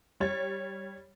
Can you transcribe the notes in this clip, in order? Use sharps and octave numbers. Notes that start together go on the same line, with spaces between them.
G3 C#5 A6